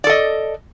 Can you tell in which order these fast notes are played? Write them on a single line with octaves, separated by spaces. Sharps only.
D5 A4 D#5